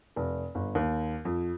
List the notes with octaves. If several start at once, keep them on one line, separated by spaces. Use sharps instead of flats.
F1
G1
D#2
F2